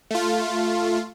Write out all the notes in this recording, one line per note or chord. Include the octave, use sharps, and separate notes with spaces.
A3 F4